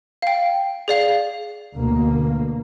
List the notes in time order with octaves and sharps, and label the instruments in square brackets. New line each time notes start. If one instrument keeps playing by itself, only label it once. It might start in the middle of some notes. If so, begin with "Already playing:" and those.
[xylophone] F5 G5
G#4 D5 F5
[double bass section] D2 B2 A#3